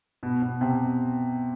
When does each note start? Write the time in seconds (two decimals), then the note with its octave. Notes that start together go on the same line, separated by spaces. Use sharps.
0.23 B2
0.42 B2
0.61 C3